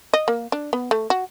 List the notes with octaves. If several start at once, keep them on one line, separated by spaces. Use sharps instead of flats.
D#5
A#3
D4
B3
A3
F#4